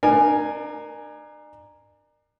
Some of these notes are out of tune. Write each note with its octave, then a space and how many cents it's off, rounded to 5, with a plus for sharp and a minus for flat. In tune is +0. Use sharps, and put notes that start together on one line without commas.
D4 +40 A#4 +0 G#5 +0